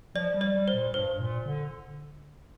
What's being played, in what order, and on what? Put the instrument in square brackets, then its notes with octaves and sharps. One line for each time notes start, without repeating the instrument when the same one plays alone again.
[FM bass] F3 [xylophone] D5
[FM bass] G3
[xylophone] D5
[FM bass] G3
[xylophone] C5
[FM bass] A#2
[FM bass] G2 [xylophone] C5
[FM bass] A#2
D3